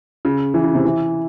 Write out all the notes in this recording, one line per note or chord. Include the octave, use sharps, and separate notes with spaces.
C#3
E3
C#3
C3
E3